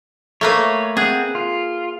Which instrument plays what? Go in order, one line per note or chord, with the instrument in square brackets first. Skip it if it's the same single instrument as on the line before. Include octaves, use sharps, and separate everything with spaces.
[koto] A3 A#3 B4 [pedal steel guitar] C#5
[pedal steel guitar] C4 F#5 F#6 [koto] G#4
[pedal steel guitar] F4